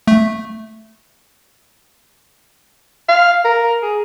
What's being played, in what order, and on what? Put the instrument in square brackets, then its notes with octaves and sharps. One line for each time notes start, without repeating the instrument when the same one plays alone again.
[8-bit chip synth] A3
[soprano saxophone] F5
A#4
G#4